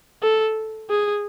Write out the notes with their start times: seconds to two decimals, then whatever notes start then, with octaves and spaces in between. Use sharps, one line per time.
0.23 A4
0.90 G#4